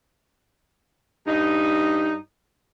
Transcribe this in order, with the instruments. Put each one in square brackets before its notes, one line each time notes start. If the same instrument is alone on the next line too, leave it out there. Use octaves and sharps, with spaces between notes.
[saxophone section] G2 G3 D#4